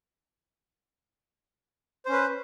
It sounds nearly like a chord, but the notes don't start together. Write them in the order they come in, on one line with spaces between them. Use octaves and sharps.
C5 C#4 B4